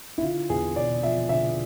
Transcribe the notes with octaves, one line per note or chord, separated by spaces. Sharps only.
E4
D3 F4
E2 G#4
E1 D5
F3 E5
D3 E5